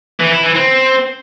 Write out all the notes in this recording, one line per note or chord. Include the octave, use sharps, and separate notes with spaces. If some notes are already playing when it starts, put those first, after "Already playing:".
E3
E4
E3
C4